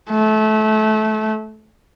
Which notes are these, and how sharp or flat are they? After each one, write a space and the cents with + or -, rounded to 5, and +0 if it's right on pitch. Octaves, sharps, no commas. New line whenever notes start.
A3 -25